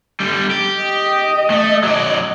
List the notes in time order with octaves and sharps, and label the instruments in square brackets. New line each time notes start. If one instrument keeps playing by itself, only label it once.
[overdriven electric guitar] D3 G3
G4
[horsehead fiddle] D#5
[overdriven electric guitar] A3
F#3 D5